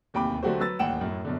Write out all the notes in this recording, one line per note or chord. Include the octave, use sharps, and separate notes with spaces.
D1 D#2 C3 G5 B5 D6
D3 F#3 A3 F#4 G4 C5
F#3 B4 E6 A6
D#1 A1 D#2 F#5 G5 E7
F#2 A2
F#2 B2 D3